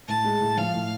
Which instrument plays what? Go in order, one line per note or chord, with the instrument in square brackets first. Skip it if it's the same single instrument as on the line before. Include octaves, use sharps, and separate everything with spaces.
[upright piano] A2 [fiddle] A5
[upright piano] G#3
A2
[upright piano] F3 [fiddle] F5
[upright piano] A2